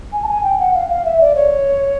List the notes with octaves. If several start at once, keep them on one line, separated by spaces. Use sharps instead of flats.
G#5
A5
G#5
G5
F#5
F5
F5
E5
D5
C#5